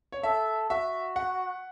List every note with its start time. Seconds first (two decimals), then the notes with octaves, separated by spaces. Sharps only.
0.12 C#5
0.23 A4 E5
0.70 F#4 E5
1.16 F#5